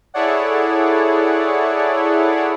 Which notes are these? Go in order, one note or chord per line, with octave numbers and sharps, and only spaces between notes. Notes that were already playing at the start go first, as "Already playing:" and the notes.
E4 G#4 A4 C#5 D5 F#5